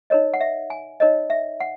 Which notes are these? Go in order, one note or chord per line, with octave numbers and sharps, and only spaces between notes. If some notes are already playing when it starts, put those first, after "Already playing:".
D#4 A#4 C#5 D#5
F#5
E5
G#5
D#4 A#4 C#5 D#5
E5
F#5